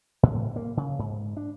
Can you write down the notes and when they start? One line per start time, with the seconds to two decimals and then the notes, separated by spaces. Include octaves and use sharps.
0.23 A2
0.56 A#3
0.77 C#3
0.99 G#2
1.37 D4